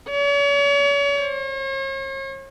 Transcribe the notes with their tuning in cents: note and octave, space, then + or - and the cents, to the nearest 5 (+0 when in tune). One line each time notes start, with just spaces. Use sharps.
C#5 +40
C#5 -45